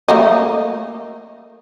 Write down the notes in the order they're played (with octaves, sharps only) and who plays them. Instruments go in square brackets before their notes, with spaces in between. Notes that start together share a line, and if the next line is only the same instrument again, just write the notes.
[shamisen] A3 A#3 D#5